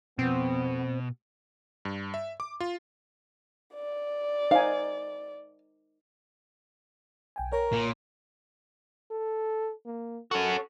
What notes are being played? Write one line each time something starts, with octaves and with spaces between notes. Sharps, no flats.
F2 B2 B3 C4
G2
E5
D6
F4
D5
D#4 C5 F5 G#5
B1 G5 G#5
A#4 C#5 A#5
A#2
A4
A#3
C#4 F#4 A4